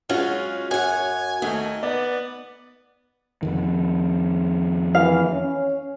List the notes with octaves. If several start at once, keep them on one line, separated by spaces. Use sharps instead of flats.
F#3 G#3 C#4 F4
F#2 C#5 F#5 G#5
D#2 A3 D#4
B3 D5
F2 D#3
E3 F5
C#4